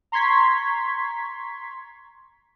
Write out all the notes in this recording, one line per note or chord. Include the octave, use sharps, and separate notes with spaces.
A#5 C6 C#6 G#6 B6